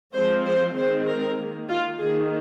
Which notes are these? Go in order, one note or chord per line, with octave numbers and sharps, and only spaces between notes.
F3 G#3 C4 C5
C5
D#3 G#3 C4 C5
A#4
D#3
A#3
F4
D#3 A#3 G#4